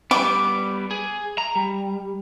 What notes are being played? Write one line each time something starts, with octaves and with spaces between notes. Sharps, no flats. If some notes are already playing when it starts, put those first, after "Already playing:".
G3 B3 D6
G#4
A#5
G3